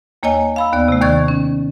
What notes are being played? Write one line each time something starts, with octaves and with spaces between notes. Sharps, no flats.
D#2 A#3 C#5 D#5 G#5
F5 B5 E6
D#2 B3 D5
C3 A3
D#2 D#3 D5 C#6 G#6 A6
C#4